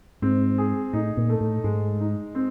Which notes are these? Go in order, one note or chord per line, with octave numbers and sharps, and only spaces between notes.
G#2 C4
G#4
A2 D#4
A#2
A3
A2
G#2 G#3
D#4
C4